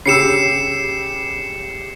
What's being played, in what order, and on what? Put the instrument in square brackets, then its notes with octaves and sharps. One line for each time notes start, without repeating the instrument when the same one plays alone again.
[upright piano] C#3 G4 E6 [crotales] C7 C#7 E7